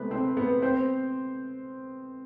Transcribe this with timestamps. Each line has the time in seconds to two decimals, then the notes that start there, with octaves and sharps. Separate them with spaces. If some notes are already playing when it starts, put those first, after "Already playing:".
Already playing: C3 G#3 A3 B3 B4
0.11 C4 C5
0.37 B3 B4
0.62 C4 C5